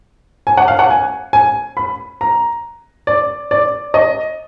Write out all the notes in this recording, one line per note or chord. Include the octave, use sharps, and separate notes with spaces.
G#5
F#5
F5
F#5
G#5
G#5
B5
A#5
D5
D5
D#5